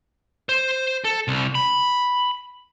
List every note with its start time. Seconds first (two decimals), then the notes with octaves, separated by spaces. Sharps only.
0.49 C5
1.05 A4
1.28 C2
1.55 B5